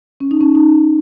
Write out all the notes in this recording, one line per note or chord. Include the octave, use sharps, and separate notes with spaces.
C#4
D#4
C#4
D#4